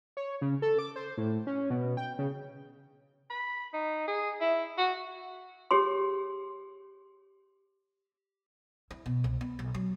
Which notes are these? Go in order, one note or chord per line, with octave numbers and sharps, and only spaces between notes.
C#5
C#3
A4
D6
C5
A2
C#4
B2
G5
C#3
B5
D#4
G#4
E4
F#4
G4 G#4 C#5 C6
E4
B2
C2
B3
B1
F#3